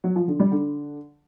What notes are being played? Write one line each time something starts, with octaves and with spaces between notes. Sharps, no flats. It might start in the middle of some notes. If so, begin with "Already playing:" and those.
F#3
F3
D3
G3
D3